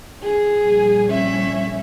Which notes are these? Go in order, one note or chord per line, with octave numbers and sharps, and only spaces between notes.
G#4
A#1 G3
C#4 E5